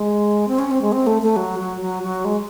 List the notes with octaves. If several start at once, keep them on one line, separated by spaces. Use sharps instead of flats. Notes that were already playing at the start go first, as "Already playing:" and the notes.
Already playing: G#3
C4
C#4
C4
G#3
C4
A3
A3
F#3
F#3
F#3
F#3
G#3